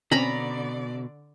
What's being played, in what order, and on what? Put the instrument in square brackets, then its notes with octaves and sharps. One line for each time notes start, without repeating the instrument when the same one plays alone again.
[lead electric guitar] B2 [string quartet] D3 D5 [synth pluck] C4 C#4 [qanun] A#5 B5